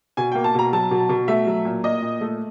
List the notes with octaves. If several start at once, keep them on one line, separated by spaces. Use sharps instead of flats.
B2 G#5
A#3 G5
A5
B2 A#5
F#3 A5
B2
B2
A3 E5
F#3
A#2
A#2 D#5
A#2
A3